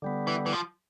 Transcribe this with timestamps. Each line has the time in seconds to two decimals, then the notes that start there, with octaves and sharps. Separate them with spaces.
0.02 D3 G3 B3
0.27 E3
0.46 E3
0.52 F3